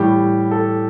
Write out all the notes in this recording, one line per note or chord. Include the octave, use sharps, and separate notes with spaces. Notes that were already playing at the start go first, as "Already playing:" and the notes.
Already playing: A2 E3 G3 G4
A4